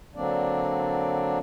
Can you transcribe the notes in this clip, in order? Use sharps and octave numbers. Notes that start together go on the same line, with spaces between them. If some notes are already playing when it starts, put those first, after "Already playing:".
D3 F#3 A#3 C4 D4 D5